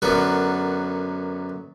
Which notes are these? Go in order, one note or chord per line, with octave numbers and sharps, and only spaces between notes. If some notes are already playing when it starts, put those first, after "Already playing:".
F#2 D3 B3 F#4 A#4